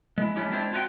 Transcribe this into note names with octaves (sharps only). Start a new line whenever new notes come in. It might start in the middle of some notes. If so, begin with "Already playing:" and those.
G#3 E4
G#3 A3 C#4 E4 G4
G#3 C4 D4 E4 F4 C5
F4 F#4 D#5 G5